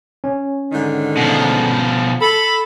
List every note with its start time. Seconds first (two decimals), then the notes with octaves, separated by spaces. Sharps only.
0.24 C#4
0.72 G#2 D3 D#3
1.17 B2 F3
2.21 A4 B5